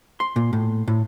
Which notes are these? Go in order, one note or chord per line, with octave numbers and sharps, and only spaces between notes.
C6
A#2
A2
A2